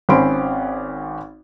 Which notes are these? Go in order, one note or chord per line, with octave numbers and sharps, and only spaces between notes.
G#1 C4 C#4 B5 C6 D7